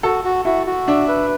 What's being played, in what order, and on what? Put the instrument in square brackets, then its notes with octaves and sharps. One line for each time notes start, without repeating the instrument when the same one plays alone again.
[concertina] F#4 [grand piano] A4
[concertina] F#4
[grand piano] E4 [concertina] F#4
[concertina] F#4
[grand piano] D4 [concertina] E5
[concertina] B4